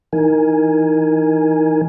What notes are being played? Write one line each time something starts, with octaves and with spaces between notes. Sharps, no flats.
E3 D#4 A#4 G#5